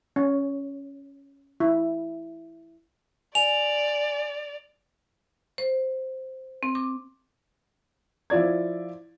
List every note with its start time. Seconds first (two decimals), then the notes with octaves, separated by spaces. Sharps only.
0.16 C#4
1.60 E4
3.35 D5 G#5 F7
5.58 C5
6.63 C4
6.75 D6
8.30 F3 E4 F4 D5 G#6